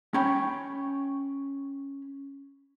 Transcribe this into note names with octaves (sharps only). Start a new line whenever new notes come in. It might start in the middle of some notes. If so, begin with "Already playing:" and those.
C#4 C#5 G5 B5